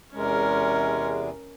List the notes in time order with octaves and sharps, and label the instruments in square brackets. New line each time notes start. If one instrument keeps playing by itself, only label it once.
[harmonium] E2 C3 G#3 [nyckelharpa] C#4 A#4